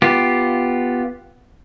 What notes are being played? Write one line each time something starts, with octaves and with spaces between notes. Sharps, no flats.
B3 F4 G4